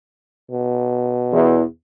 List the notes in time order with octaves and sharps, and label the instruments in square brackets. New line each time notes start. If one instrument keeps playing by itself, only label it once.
[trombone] B2
[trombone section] E2